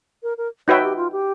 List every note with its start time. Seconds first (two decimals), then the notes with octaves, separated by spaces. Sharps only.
0.23 A#4
0.38 A#4
0.68 D#4 F#4 B4 C#5 E5 G5
0.83 G4
0.97 F4
1.12 G4